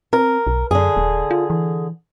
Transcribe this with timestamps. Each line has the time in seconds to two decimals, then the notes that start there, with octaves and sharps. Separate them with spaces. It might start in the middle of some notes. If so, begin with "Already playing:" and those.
0.13 C4 A#4
0.47 B1
0.71 F#2 D3 G#4
0.96 D#1
1.31 F4
1.50 E3